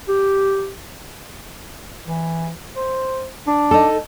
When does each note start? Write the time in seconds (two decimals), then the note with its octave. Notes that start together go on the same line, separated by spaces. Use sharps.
0.08 G4
2.05 E3
2.76 C5
3.47 D4
3.71 D#4 A4